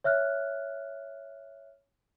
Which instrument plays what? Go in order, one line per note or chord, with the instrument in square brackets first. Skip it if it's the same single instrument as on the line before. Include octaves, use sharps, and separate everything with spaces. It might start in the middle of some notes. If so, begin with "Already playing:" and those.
[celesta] C#5 E5 F6 F#6